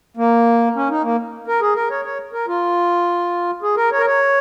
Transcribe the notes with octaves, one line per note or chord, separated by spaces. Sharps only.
A#3
C#4
D#4
A#3
A#4
G#4
A#4
C#5
C#5
A#4
F4
G#4
A#4
C#5
A#4
C#5